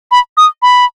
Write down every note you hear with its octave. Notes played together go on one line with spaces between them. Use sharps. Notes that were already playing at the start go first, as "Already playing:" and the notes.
B5
D#6
B5